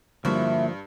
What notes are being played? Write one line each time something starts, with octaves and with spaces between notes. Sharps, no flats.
G2 D3 F3 A#3 E4 F#4 E5